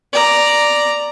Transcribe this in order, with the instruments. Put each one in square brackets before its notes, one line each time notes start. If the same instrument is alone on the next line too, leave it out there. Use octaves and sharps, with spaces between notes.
[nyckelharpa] D5 A#5